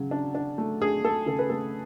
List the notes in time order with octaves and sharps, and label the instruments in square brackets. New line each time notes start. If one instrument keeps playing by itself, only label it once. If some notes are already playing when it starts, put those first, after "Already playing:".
Already playing: [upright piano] C#3 F#3
D4
D4
A3
D4 G#4
A3 A4
C#3 A4
B4
A3 A4